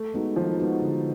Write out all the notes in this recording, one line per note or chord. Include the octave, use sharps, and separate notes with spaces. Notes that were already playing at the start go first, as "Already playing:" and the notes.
Already playing: A3
G#3 B3 D#4 F#4
D#3 F3
G#3 B3 D#4 F#4
D3